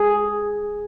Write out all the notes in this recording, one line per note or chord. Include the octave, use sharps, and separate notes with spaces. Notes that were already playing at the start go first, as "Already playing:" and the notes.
Already playing: G#4